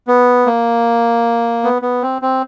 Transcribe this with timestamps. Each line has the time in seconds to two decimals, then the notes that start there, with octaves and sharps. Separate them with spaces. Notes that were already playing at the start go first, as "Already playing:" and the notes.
0.07 B3
0.46 A#3
1.64 B3
1.82 B3
2.02 C4
2.22 C4